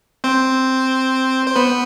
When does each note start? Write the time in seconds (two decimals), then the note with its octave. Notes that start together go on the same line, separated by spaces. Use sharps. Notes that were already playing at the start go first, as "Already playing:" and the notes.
0.24 C4 C5
1.47 C5
1.56 B3 B4